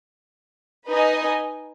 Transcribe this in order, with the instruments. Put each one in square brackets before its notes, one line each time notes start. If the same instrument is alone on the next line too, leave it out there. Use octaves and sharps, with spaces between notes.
[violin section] D#4 B4 D#5 G#5